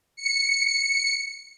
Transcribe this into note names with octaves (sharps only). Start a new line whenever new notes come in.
C#7